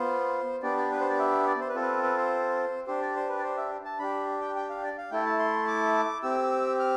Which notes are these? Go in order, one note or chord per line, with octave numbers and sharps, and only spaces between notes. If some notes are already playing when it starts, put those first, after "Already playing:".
Already playing: B3 F4 C5
B3 D4 G4 D5
D5
B4
C5
D5
E5
D5
C5
B4
C4 F4 A4
B4
B4
C5
D4 G4 C5
D5
C5
B4
D5
C5
E5
A5
D4 G4 B5
G5
G5
F5
D5
F5
A3 E4 A4 G5
A5
C6
D6
C4 G4 E6
F6